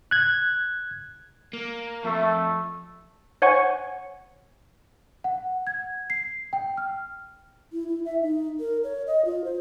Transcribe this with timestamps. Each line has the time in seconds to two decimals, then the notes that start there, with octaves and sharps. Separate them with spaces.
0.11 F#6 G#6
1.53 A#3
2.04 F2 A3
3.42 C5 C#5 F#5 G#5 C#6
5.24 F#5
5.67 G#6
6.10 C7
6.53 G5
6.77 F6
7.73 E4
7.88 E4
8.05 E5
8.22 D#4
8.60 A#4
8.84 C#5
9.07 D#5
9.25 F4
9.45 C5